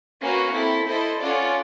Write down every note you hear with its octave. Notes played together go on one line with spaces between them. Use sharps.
A#3 C#4 F#4 B4
C4 E4 A4
E4 A4 C5 D#5
C#4 F4 A4 D5 F#5